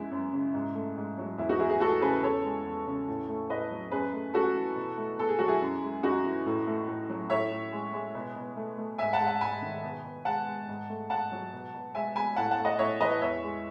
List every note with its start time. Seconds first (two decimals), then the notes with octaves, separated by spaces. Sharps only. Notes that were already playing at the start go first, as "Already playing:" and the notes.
Already playing: F#2 B2 G#3 E4
0.11 F#2
0.33 C#3
0.54 G#2
0.75 A3
0.97 G#2
1.18 F#3
1.38 E2 E4
1.49 D#4 F#4
1.59 E3 E4 G#4
1.70 E4 G#4
1.80 A3 F#4 A4
2.01 C#3 G#4 B4
2.23 E2 A4 C#5
2.44 G#3
2.66 E2
2.87 C#3
3.08 A2
3.29 A3
3.50 A2 B4 D#5
3.71 F#3
3.91 F#2 G#4 B4
4.13 A3
4.34 F#2 F#4 A4
4.55 E3
4.76 B2
4.98 A3
5.19 B2 A4
5.29 G#4
5.39 F#3 F#4
5.48 E4 G#4
5.62 F#2
5.82 G#3
6.03 F#2 D#4 F#4
6.25 E3
6.46 A2
6.67 A3
6.88 A2
7.09 F#3
7.30 A2 C#5 E5
7.51 A2
7.72 G#3
7.93 G#3
8.15 B2
8.36 B2
8.56 A3
8.78 A3
8.98 G#2 E5 G#5
9.13 F#5 A5
9.20 G#3
9.27 F#5 A5
9.41 G#2 G#5 B5
9.62 D#3
9.83 B2
10.05 B2
10.25 G#3 F#5 A5
10.47 G#3
10.68 G#2
10.89 A3
11.10 G#2 F#5 A5
11.32 F#3
11.53 B2
11.74 B2
11.95 G#3 E5 G#5
12.15 G#3 G#5 B5
12.36 A2 F#5 A5
12.51 F#5 A5
12.58 A3
12.65 D#5 F#5
12.79 A2 C#5 E5
13.00 E3 B4 D#5
13.21 E2 C#5 E5
13.43 G#3